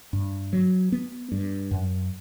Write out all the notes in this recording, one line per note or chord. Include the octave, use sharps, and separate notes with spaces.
G2
F#3
B3
G2
F#2